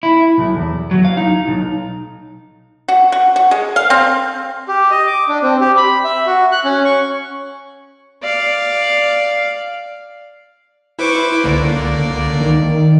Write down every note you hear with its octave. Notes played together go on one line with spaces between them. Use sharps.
E4
B1
E2
F#3
F5
D#4
B1
F#4
F#4
F#4
G#3
F5
C4
G4
D#5
D6
D4
C4
G4
B5
E5
F#4
F#6
C#4
C#6
D5 F5
E4 B4 C5 C#6 D6
C#2 D3 A#3 D5
D#3